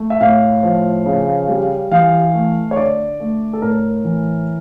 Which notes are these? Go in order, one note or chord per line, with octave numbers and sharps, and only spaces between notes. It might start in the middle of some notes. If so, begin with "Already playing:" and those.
Already playing: A3
E5
A2 F5
F3
C#3
G3
E3 F5
A3
C#5
D3 D5
A3
A4
A2 A#4
E3